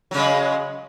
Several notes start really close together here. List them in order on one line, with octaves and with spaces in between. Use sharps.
F#3 C#3 G#3